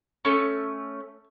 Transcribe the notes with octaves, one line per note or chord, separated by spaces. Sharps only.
A3 C#4 C#6